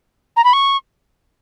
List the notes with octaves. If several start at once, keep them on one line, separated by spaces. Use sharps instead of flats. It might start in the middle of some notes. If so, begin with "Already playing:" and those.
A#5
B5
C#6